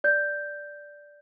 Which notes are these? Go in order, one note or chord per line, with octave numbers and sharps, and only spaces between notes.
D5 G6